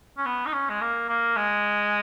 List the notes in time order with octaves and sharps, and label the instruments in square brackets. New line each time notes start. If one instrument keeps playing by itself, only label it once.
[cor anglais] C#4
B3
D#4
C#4
G#3
A#3
A#3
G#3